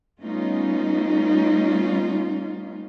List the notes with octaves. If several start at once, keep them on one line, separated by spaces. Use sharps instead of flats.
G3 A3 B3 C#4 D#4 F4